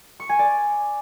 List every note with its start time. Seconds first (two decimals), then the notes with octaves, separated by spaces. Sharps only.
0.20 C#6
0.29 G#5
0.39 D5